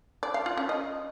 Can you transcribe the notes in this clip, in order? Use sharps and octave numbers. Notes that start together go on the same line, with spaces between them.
D5
F5
F4
C#4
D#5